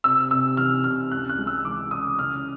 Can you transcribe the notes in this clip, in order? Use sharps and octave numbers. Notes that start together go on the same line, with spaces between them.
C3 E6
C3 E6
E3 F6
C3 F6
C#2 F#6
F#6
G#3
E6
E3 D6
C#3 D#6
C#3 F6